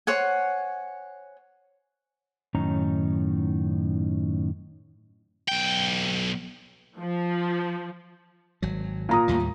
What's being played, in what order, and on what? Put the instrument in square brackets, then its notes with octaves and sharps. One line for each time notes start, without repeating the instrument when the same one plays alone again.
[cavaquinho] C5 C#5 F#5 G#5
[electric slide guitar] F#2 A2 D#3 C#4 D#4 A#5
[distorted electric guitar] B1 G5
[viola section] F3
[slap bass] G#1 F#3
[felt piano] A#2 A#5 D#6
[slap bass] D#2 A2 G3